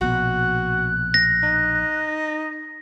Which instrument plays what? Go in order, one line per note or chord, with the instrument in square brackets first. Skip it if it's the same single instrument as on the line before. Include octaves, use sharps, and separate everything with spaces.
[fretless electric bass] A#1 B2 [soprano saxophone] F#4 [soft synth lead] F#6
[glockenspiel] A#6
[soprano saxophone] D#4